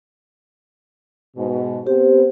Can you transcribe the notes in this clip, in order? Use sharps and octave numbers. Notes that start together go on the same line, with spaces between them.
G#2 B2
B3 C4 G4 C5